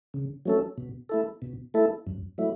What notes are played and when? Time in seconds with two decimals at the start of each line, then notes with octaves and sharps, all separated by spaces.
0.14 C#3
0.46 F#3 A3 C#4 A4
0.78 B2
1.09 A3 E4 A4
1.42 B2
1.74 A3 E4 A4
2.07 F#2
2.38 F#3 A3 E4